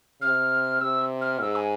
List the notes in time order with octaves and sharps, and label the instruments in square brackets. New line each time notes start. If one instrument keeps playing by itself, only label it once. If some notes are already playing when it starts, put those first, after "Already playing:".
[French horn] C3 [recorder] F6
[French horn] C3 [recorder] E6
[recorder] F6
[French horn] G#2 [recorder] E6
[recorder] G#5